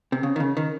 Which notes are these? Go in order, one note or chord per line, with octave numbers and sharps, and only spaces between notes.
C3
C#3
D#3
C#3
D#3